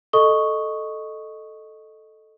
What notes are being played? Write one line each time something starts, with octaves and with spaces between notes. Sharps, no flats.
A4 D#5 C#6 D#6 G7